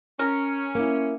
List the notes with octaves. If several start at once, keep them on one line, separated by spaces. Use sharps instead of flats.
C#4 A#4
A#3 E4